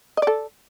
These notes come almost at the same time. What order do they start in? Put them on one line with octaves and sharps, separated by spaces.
D#5 D5 A4